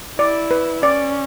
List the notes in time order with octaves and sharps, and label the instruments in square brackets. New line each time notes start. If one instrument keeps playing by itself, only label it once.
[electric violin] E4 [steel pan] D5
[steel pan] B4
[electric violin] C#4 [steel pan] D5